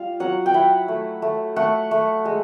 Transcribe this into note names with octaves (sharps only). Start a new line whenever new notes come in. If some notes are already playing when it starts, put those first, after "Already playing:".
Already playing: G3 F4 F5
F#3 F#5
G5
E4 F#5
A3
A3
A3 F#5
A3
G#3